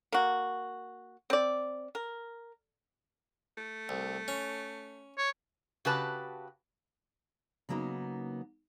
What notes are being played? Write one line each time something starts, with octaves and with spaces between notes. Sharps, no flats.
A#3 F#4
C4 D5
A#4
A3
C2
C#4
C#5
C#3 F#4 G4 B4 A5
C#3 F#3 A#3 B3 D#4